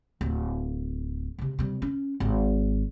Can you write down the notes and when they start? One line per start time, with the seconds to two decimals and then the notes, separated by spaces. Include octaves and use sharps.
0.21 D1
1.39 G#2 C3
1.59 C3 G3
1.82 C#4
2.20 G#1